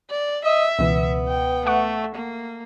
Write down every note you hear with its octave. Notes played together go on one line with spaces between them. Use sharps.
D5
D#5 E5
C#2 B2 E3 B3
G5
A3 E5 F#5 C#6
A#3